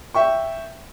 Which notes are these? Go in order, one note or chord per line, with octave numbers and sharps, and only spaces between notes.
E5 G5 C#6